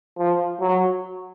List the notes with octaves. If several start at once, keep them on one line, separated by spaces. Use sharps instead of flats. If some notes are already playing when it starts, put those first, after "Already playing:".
F3
F#3